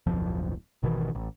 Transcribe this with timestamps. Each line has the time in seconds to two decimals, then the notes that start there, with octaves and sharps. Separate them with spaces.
0.06 D1 B1 F2 F3
0.83 G#1 B2 D#3 E3
1.15 A1